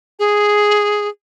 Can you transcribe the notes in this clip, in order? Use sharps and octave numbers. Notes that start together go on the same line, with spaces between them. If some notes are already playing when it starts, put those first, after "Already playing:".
G#4